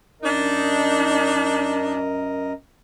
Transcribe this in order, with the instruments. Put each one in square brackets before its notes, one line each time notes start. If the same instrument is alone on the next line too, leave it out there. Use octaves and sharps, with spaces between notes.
[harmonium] F#2 A#4 D#5 [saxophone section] D4 D#4